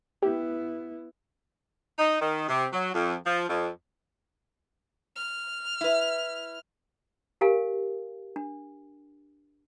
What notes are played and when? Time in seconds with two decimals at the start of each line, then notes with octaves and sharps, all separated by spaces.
0.23 B3 E4 G4
1.99 D#4
2.21 D#3
2.48 C3
2.73 F#3
2.94 F2
3.26 F3
3.49 F2
5.16 F6
5.81 E4 B4
7.41 G4 A#4 F5 G#5
8.36 D4